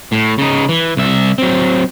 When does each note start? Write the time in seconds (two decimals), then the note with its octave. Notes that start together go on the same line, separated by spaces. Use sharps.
0.12 A2
0.38 C#3 D#4
0.69 E3
0.97 C2 E5
1.38 F#3 C4